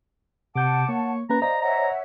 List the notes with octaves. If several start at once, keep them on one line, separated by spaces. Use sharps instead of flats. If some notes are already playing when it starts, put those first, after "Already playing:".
C3 F#5 A5 D6 G6
A#3 C#5
A#3 C#4 B4 A#5
C5 D5 D#5 F5 A#5
C#5 E5 F#5 A#5